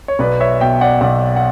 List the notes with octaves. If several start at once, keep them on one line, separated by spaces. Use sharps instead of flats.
C#5
B1 B4 D5
C#5 E5
B2 E5 G5
D5 F#5
B1 D5 F#5
F#5